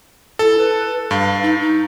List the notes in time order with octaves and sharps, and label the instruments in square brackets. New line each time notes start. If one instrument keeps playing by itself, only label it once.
[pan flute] E4 [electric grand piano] A4
[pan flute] B4
[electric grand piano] G2 [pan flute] F5
[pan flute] D#4
D#4